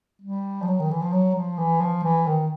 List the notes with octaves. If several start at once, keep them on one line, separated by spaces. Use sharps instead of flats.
G3
F3
F#3
D#3
E3
F3
F#3
F3
E3
F3
E3
D#3